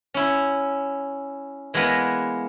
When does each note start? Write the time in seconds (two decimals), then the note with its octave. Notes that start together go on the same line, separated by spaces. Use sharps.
0.14 C#4 E4
1.74 E3 G#3 A#3 B3 A#4 B4